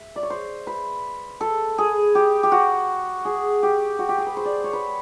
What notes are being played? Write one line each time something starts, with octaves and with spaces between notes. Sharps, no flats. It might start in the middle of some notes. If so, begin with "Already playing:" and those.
Already playing: E5
D5
C#5
C5
B4
A4
G#4
G4
G4
F#4
G#4
G4
F#4
G4
G#4
B4
C5
D5
C#5
B4